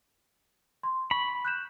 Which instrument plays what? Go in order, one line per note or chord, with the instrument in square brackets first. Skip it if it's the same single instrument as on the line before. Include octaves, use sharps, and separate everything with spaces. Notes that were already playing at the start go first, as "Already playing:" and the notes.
[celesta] C6
[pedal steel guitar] B5 [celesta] C#6
[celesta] F#6 G6 E7